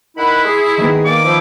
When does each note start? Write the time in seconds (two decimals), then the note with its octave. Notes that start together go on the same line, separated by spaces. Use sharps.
0.17 D#3 E4 F#5 B5
0.44 G#4 C6
0.77 D#3 B3
1.05 A#3 D5 D6
1.24 F3 E4